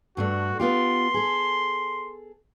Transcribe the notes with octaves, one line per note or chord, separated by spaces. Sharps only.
G2 A3 D4 F#4
B3 F4 G4 C6
G#4 A4